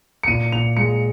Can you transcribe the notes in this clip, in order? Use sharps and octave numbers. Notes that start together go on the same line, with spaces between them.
C#7
A#2 D#7
A#2 F7
G#3 C#7